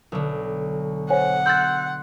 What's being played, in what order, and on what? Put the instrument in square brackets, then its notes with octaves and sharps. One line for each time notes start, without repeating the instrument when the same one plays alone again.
[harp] B1 D3
[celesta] C5 C#5 G#5 [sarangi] F#5
[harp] C6 E6 F#6 [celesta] G6 A6